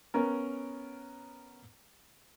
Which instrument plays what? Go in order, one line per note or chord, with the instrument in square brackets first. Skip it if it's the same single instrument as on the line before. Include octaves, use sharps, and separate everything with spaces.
[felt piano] B3 C#4 A#4